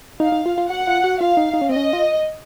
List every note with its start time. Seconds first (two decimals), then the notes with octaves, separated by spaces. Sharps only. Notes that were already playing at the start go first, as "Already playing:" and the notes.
0.20 D#4 F5
0.32 D#4
0.46 F4
0.58 F4
0.70 F#4 F#5
0.87 F4
1.04 F#4
1.20 F4 F5
1.37 D#4
1.54 D#4
1.61 C#4
1.69 C4 D#5
1.76 C#4
1.93 F4